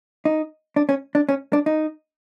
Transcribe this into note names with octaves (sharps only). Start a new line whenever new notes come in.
D#4
D4
C#4
D4
C#4
D4
D#4